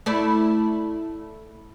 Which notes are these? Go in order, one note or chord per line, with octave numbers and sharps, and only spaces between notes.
A3 E4 D5